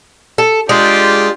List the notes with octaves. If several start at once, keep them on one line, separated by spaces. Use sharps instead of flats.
A4
G#3 D4 F4 G4